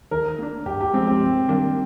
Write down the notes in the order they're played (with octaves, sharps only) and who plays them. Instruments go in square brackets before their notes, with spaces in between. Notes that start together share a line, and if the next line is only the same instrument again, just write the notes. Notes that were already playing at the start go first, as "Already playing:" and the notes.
[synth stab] D#3 [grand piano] A#4
[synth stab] A#3 D4
[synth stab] G2 [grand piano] G4
[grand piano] G4
[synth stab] F3 G#3 [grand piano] C4
[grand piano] C4
[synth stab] C3
D#3 G3 A#3 D4